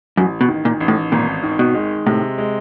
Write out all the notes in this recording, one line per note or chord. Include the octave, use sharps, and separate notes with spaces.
A1 F#2
B2
D#3
A#2
A1
A2
G#1 A#2
D#3
B2
G#3
A2 C3
G#3